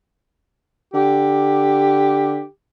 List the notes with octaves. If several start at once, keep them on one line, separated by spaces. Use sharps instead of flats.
D3 G4